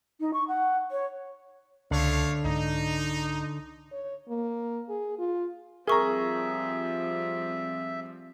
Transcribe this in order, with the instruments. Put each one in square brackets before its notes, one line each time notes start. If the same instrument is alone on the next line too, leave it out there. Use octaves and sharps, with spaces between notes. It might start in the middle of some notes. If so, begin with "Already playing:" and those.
[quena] D#4
C#6
F#5
C#5
[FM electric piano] C#2 C7 [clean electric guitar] D3 [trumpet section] A3 C#5 F5
[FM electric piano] C2 G#2 [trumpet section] D#4
[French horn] C#5
A#3
G#4
F4
[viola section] F3 G3 C4 [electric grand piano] G#4 A#5 [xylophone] A#4 C#6 [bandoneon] E5